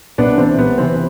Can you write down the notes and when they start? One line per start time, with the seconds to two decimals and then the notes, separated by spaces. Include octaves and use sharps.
0.18 C2 B3 D4
0.38 C3 E3 C4
0.58 C2 B3
0.78 C3 E3 C4